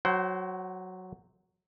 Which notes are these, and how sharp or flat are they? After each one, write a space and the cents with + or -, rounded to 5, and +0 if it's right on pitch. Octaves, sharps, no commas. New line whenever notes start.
F#3 +0 C5 +0 F#5 +40